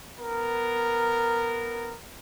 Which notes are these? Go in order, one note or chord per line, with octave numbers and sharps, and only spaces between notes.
B3 A#4